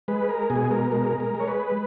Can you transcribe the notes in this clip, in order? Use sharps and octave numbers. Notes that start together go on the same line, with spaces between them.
G#3 B4
A#4
B2 G#4
A#4
G#3 A#4
A#4
G#3
C#5
B4